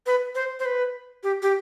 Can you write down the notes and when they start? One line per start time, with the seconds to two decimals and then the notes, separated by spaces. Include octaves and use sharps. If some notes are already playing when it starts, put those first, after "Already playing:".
0.06 B4
0.35 C5
0.60 C5
0.65 B4
1.23 G4
1.42 G4